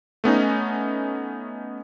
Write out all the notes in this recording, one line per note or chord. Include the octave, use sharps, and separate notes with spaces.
A3 B3 C#4 D#4